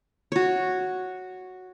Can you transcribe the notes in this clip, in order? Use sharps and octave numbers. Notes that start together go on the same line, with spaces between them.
F#4 C#5